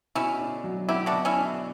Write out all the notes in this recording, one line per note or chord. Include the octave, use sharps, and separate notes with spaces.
B2 C#4 E4
D4
F#3
B3 E4 G4
D4 F#4
B2
C#4 E4
D4